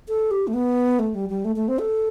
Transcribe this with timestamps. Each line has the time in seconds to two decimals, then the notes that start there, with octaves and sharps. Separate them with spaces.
0.08 A4
0.31 G4
0.47 A3
0.54 B3
0.99 A3
1.14 G3
1.29 G3
1.45 A3
1.56 A3
1.68 C4
1.79 A4